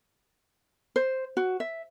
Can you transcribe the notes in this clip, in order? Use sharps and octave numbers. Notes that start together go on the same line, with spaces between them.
C5
F#4
E5